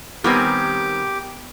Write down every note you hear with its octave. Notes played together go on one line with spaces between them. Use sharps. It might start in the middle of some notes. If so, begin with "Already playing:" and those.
D#3 G3 B3 C4 G4 A#4 G#5 D6